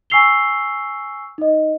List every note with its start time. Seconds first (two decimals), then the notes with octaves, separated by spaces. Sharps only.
0.10 G#5 C#6 E6 C7 F7 G7
1.38 D#4 D#5